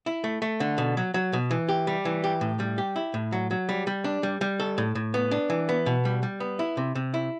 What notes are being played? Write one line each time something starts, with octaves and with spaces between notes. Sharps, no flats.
E4
A3
A3
D3
B2
F#3
F#3
B2
E3
G4
G3
E3
G4
A2
G3
G4
E4
A2
F#3
F#3
G3
G3
D4
G3
G3
A4
A2
A2
B3
D4
E3
B3
B2
G3
G3
B3
E4
C3
C3
E4